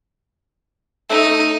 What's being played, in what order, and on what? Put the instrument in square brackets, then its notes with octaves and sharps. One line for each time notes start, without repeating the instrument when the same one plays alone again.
[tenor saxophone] A3 [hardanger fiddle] D#4